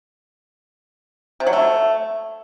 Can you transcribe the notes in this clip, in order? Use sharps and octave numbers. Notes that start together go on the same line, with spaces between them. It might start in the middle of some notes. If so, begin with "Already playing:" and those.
C3
F#3
A3